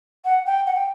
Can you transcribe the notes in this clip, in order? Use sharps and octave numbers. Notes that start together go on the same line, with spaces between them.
F#5
G5
F#5
G5